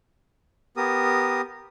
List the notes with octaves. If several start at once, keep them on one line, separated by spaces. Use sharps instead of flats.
B3 G4 A#4 D#6